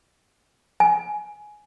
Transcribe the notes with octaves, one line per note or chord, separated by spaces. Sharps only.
G#5